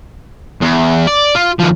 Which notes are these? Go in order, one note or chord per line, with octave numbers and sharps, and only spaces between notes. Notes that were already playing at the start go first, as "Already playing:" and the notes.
E2
D5
F4
D#2 F3